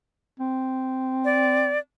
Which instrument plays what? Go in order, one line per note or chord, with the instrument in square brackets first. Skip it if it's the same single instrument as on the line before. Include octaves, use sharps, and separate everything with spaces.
[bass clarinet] C4
[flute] D5